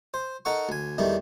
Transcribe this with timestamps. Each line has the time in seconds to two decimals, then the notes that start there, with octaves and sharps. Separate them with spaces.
0.14 C5
0.45 D#4 A4 A#4 F#5 C#6
0.69 D2 G#5
0.98 E2 D#3 G3 A3